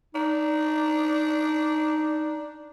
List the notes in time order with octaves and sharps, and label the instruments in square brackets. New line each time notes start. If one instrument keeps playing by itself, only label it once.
[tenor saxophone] D4 [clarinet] D#4